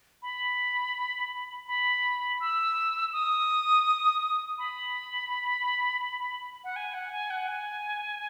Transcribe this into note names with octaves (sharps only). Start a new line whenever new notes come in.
B5
B5
E6
D#6
B5
F#5
G#5
F#5
G#5
F#5
G#5